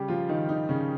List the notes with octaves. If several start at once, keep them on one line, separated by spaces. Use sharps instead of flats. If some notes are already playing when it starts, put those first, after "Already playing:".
Already playing: C#3 G3 C#4 G4
F3 F4
D#3 D#4
D#3 D#4
C#3 C#4